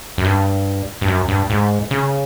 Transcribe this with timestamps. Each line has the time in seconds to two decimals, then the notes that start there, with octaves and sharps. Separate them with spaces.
0.18 F#2
0.25 G2
1.01 G2
1.08 F#2
1.29 G2
1.50 G#2
1.91 C#3